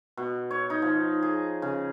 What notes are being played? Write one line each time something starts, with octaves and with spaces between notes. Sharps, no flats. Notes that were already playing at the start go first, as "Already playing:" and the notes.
B2
C#5
D#4
F3
G#4
C#3